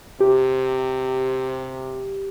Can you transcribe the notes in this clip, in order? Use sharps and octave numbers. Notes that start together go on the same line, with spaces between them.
C3 G4